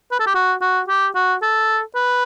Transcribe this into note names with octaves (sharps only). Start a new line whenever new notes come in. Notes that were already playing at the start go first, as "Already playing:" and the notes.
B4
A4
G4
F#4
F#4
G4
F#4
A4
B4